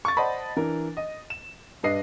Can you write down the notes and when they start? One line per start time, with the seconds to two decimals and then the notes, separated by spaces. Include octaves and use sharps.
0.05 C#6 A6
0.17 C5 D5 D#5 F#5 A5 B5
0.57 E3 D4 A#4
0.97 D#5
1.30 E7
1.83 G2 D4 B4 D#5 C7